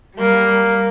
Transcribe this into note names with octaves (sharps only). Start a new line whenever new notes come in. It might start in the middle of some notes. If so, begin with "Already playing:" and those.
G3 A#3